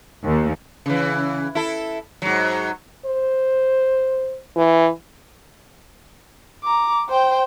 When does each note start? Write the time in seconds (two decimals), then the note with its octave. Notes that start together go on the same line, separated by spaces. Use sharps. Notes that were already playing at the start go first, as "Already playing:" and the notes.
0.25 D#2
0.86 C#3 E3
1.55 E4 A4
2.22 G#2 F#3
3.06 C5
4.56 E3
6.63 A#5 D6
7.09 C5 G5